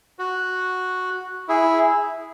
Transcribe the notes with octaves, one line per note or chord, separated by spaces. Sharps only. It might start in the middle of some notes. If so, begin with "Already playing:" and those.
F#4
E4 G#4